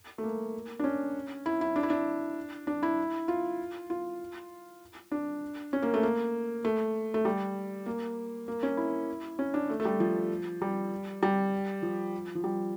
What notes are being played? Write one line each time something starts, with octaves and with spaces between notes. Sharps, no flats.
A3
A#3
D4
C#4
E4
E4
D4
E4
D4
D4
E4
F4
F4
D4
C#4
A#3
A3
A#3
A3
A3
G3
A#3
A#3
C#4
E4
C#4
D4
A3
A3
G3
F3
G3
G3
F3
F3
G3